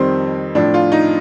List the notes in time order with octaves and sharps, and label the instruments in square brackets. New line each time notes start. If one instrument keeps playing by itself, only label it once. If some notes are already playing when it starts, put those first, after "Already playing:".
Already playing: [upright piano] F2 D#3 G3 C4
A2 F3 D4
F4
D#4